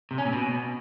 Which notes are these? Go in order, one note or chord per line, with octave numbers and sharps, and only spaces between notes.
C3
C#4
A#2
B2